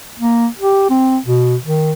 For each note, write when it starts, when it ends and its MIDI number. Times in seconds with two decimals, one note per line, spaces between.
0.19 0.47 58
0.59 0.88 67
0.90 1.18 60
1.25 1.56 47
1.65 1.92 51